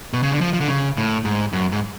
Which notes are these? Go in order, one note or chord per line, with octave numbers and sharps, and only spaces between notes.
B2
C#3
D3
F3
F3
D3
C#3
A2
G#2
F#2
G#2